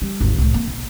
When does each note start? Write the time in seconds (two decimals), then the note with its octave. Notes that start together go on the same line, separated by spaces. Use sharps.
0.02 G3
0.21 G#1 D#2
0.38 C2 A2
0.54 A#3
0.67 B1